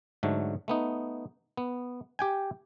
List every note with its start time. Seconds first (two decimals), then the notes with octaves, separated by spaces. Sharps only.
0.23 G#2 D3 F#3 A3
0.68 A3 B3 D#4
1.57 B3
2.19 G4 G5 G#5